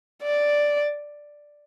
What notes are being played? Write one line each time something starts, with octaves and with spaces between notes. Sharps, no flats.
D5